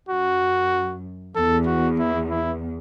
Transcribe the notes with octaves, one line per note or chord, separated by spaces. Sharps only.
F#2 F#4
E2 A4
F#4
E4
E4